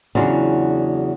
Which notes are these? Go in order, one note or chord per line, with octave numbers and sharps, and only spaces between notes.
E2 C#3 F#3 D4 F4